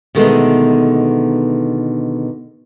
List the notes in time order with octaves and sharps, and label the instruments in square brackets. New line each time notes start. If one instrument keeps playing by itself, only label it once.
[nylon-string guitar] B2 D3 D#3 G#3 A3 B3